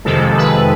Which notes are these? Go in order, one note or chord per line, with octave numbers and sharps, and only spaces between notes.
F2 C3 D#3 G#3 A4
B4